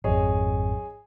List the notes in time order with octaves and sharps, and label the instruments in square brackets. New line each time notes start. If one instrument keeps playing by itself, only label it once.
[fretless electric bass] G#1 F2 [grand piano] G#4 C#5 D#5